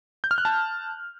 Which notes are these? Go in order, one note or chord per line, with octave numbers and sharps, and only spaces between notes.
G6
F6
F#6
A5